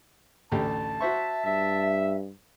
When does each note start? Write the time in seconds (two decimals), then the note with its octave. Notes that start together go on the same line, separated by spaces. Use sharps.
0.52 A1 D2 G4 A5
1.01 F#4 C5 E5 C#6
1.46 G2 E5